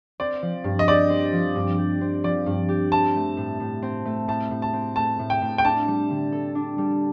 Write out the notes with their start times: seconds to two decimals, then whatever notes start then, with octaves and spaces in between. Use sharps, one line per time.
0.20 C4 D5
0.42 F3
0.64 G2
0.79 D#5
0.88 G4 D5
1.10 C4
1.33 F3
1.55 G2
1.78 G4
2.01 C4
2.24 F3 D5
2.46 G2
2.69 G4
2.92 C4 A5
3.15 A3
3.37 A2
3.60 A2
3.83 C4
4.05 A3
4.28 A2 A5
4.51 A2
4.62 A5
4.73 C4
4.96 A3 A5
5.19 A2
5.30 G5
5.42 A2
5.58 G5
5.64 D4 A5
5.88 G3
6.10 D3
6.32 A4
6.55 D4
6.78 G3